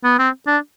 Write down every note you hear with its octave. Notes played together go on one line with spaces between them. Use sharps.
B3
C4
D4